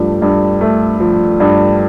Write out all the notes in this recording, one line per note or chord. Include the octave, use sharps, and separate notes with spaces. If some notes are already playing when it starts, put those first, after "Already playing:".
Already playing: G2 F3 A3
G2
A3
F3
G2